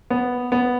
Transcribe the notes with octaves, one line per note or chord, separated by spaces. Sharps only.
B3
B3